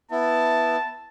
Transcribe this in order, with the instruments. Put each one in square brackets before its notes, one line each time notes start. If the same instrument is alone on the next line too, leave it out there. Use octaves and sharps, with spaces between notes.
[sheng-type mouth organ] B3 E4 [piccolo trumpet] A5